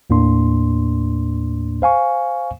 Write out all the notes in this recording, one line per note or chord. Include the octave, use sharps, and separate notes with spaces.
D#2 A2 A#3 D4 C6
C5 F5 G#5 C#6